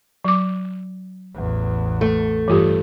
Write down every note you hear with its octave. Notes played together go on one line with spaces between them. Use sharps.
F#3 D6
A1 E2
A3
G2 E3 F4 G4